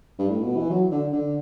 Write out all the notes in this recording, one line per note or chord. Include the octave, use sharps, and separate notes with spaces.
G2
A2
B2
E3
F#3
D3
D3